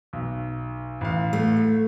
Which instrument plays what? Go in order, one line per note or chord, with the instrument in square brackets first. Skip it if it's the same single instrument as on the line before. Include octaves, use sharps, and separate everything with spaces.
[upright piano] B1
A1 F5
[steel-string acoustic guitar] A3